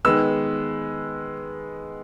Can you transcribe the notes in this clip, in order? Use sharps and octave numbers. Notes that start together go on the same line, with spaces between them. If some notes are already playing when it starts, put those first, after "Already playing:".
D#3 G#3 B3 E6